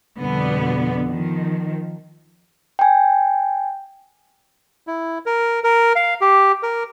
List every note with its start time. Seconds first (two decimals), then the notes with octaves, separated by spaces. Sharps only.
0.19 F2 B2 D3 G3 B3
1.06 D#3 F3
2.79 G5 G#5
4.87 E4
5.26 A#4
5.64 A#4
5.96 F5
6.21 G4
6.63 A#4